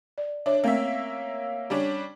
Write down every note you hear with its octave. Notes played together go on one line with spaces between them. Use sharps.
D5
D4 C#5 E5
A3 A#3 C4 C#4 E5
G3 C#4 D4